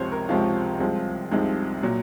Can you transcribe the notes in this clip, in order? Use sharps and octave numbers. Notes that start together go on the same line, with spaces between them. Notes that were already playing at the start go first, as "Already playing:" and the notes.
Already playing: C#2 C3 F3 G#3 C5 C#5
A#4
C#2 C3 F3 G#3 F4
C2 C3 F3 G#3
C2 C3 F3 G#3 D#4
A#2 F#3